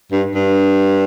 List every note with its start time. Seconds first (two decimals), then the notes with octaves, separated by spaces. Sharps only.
0.12 G2
0.35 G2